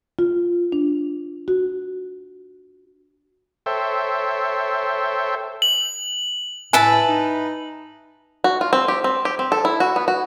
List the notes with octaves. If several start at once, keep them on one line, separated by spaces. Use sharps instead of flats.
F4
D4
F#4
A4 C5 C#5 E5 G5
F#7
A2 B4 E5 G#5 A5
D#4
F#4
F4
C4
G4
C4
G4
C4
A4
E4
F#4
B3
F#4